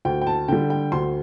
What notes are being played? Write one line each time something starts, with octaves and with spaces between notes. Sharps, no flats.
D2 G5
G5
A5
D3 G3 G5
G5
D2 C6